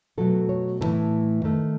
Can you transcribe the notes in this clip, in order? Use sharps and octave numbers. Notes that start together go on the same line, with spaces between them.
B2 F#3 A3 A4
C#5
A2 E3 A3 A5
D#3 A3